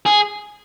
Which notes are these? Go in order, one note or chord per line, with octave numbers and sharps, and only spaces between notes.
G#4